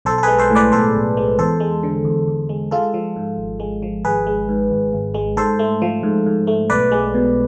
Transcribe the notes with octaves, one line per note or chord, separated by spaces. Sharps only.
B1 A4 C5
A4
G#3 G#4 B4
A4 C5
A2
B4 D5
B1 A4 C5
B1
G#3
E2 A4 C5
G#3
D3
E2
E2
G#3
G#3 F4 A4
F3
G#2
G#1
G#3
F3
G#1 G#4 B4
G#3
G#2
G#1
G#1
G#3
G#2 A4 C5
A3
F3
G#2
G#2
A3
B1 B4 D5
G#3
B2